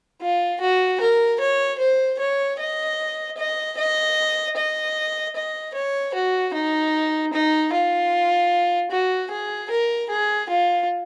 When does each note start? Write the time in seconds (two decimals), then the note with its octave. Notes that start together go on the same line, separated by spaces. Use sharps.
0.21 F4
0.60 F#4
1.01 A#4
1.40 C#5
1.79 C5
2.19 C#5
2.59 D#5
3.37 D#5
3.77 D#5
4.56 D#5
5.36 D#5
5.74 C#5
6.14 F#4
6.54 D#4
7.33 D#4
7.72 F4
8.91 F#4
9.31 G#4
9.71 A#4
10.10 G#4
10.49 F4